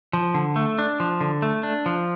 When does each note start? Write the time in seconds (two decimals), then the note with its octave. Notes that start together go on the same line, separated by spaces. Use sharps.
0.13 F3
0.34 D3
0.56 A3
0.79 D4
1.00 F3
1.21 D3
1.42 A3
1.63 D4
1.86 F3